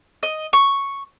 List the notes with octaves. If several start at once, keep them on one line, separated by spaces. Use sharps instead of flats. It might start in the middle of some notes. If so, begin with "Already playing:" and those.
D#5
C#6